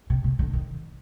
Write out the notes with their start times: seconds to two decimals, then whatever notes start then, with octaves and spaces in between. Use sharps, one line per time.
0.10 C3
0.24 C3
0.39 D3
0.53 D#3